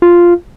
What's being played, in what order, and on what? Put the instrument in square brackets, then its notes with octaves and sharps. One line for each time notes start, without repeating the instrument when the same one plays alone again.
[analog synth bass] F4